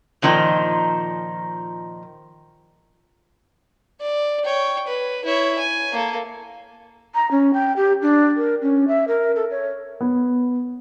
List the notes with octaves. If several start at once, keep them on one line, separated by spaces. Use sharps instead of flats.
A#2 D#3 F3 D#4
D5
C#5 G5
B4
E4 C#5
G#5
A#3 A4
A#5
C#4
G5
G4
D4
A#4
C#4
E5
A#4
A4
C#5
B3